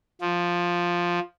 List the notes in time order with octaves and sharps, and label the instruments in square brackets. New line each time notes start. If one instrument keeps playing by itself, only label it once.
[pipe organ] F3